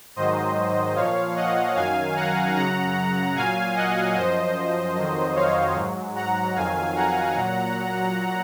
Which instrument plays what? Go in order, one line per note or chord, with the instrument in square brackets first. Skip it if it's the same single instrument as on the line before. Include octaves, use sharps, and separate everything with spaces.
[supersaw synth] G#2 D#3 F#3 C5 D#5
A#2 F3 C#5 F5
D#5 F#5
F#2 D#3 F#3 F5 G#5
F#5 A#5
F#2 C#3 F#3 F#5 A#5
A#2 F#3 F5 G#5
D#5 F#5
F#2 F3 C5 D#5
F2 D#3 F#3
C#5 F5
G#2 F#3
F#5 A#5
F2 D#3 F#3 F5 G#5
F#5 A#5
A#2 F#3